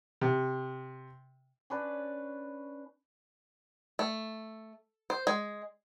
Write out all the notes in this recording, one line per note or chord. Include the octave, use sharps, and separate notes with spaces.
C3
C#4 D4 B4
A3
C5
G#3